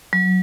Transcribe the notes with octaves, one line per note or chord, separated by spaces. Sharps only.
F#3